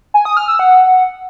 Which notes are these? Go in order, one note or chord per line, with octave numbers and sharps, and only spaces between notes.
G#5
D#6
F6
E6
F#5